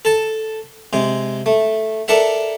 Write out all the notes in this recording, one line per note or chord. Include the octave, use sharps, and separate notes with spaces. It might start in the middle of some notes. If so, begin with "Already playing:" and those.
A4 A5
C3 G#3
A3
D4 A4 A#4 E5 F#5